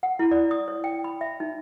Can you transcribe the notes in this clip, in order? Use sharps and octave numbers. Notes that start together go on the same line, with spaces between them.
F#5
E4
D5
D#6
C#5
G5
B5
E5
D#4